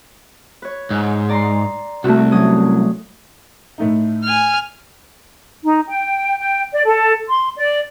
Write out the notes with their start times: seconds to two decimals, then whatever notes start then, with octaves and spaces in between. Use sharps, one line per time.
0.62 B4 C#5
0.91 G#2
1.29 D5 A#5 C6
2.04 C2 A3 F#4
2.32 F#3 C#4 D#6
3.78 A2 A3 D#4
4.24 G#5 F6
5.63 D#4
5.87 G5
6.38 G5
6.72 D5
6.84 A4
7.28 C6
7.56 D5